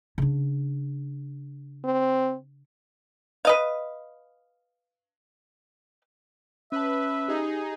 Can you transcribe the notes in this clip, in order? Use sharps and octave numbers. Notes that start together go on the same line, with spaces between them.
C#3 D4
C4
B4 D#5 F5
C#4 B4 E5 A5
D#4 G4 G#4